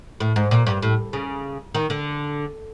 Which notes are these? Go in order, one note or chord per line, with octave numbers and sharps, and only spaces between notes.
A2
G#2
A#2
G2
A2
C#3
D#3
D3